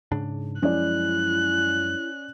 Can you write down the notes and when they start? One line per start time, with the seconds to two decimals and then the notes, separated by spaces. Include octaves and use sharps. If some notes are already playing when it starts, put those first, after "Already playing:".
0.12 G#2 C#3 D4
0.62 F#2 F3 G#3 C#4 E4 D5 F#6